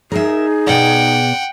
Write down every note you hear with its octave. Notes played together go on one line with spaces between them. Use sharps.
D#4 G#4 A#4 E5
B2 D5 F#5 G5